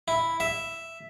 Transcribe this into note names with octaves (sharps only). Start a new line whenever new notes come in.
E4
E5